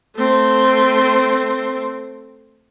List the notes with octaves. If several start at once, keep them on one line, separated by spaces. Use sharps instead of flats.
A3 C4